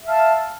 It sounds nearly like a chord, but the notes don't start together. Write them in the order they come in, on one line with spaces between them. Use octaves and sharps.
E5 F5 A5